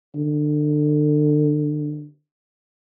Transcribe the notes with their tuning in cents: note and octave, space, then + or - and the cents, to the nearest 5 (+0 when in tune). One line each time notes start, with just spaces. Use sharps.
D3 +30